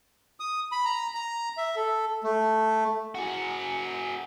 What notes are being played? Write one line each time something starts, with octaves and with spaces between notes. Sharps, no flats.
D#6
B5
A#5
A#5
E5
A4
A3
F#4 G#4